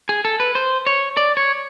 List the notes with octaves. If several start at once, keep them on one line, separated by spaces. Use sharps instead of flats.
G#4
A4
B4
C5
C#5
D5
C#5